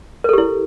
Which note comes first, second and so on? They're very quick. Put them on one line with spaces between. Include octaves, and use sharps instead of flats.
A#4 A4 G4 E4